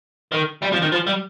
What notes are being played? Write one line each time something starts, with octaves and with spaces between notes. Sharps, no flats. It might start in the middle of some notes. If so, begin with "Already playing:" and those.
D#3
G3
F3
D#3
F3
G3